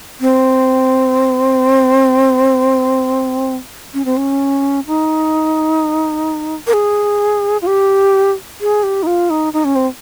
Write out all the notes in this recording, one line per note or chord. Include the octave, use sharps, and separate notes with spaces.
C4
C#4
C4
C#4
D#4
A#4
G#4
F4
G4
G#4
G4
D#4
F4
D#4
D#4
C#4
C4